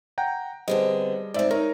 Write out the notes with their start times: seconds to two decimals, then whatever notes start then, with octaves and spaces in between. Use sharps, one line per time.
0.18 F#5 G5 A#5
0.68 D3 G3 B3 C4 G#4 D#5
1.34 G#2 C4 D5 E5
1.51 D#4 A#4 C#5 A#5